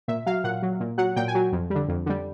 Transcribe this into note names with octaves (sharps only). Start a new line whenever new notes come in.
A#2 E5
F#3 F5
A#2 F#5
F#3
A#2
F#3 F#5
A#2 G5
G#5
F#3
F2
D3 G3
F2
D3 G3